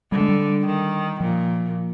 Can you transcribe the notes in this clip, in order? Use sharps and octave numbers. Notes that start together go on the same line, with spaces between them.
D3 G3
G#3
G3
D#3
A#2 F3